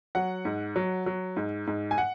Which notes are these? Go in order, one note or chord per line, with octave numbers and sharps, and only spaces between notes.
F#3 F#5
G#2
F#3
F#3
G#2
G#2
G#5
F#5